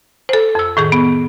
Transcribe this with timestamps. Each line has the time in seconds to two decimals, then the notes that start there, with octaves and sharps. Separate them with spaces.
0.29 A4 C5
0.55 F2 E6
0.77 A2 D#3 G#4
0.92 B3